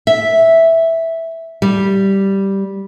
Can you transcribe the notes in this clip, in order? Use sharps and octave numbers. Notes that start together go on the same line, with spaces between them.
E5
G3